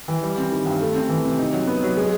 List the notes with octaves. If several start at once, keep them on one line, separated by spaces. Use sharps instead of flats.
E3
G3
C4
D#3
G2
A3
C4
E3
C3
D#4
F#3
B3
F#3
G#3